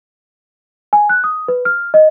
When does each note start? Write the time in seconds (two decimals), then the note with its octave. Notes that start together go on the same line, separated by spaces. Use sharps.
0.93 G#5
1.09 F#6
1.24 D#6
1.48 B4
1.65 F6
1.94 D#5